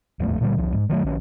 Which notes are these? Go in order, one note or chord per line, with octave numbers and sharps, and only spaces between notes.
D#1 A#1 F2 A3
A#2 D3 F3 G3
E1 C2 F3
G#2
D#3 F#3 G#3 A3
A#1 D#3 C#4